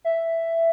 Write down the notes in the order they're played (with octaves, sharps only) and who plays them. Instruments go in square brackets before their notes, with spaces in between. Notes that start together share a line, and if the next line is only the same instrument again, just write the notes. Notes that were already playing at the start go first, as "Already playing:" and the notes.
[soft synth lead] E5